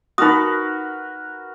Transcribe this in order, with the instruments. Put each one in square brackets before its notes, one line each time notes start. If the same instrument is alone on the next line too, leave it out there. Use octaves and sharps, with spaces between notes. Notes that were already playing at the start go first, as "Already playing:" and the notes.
[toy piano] D#4 D#6 [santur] F#4 A#4 B4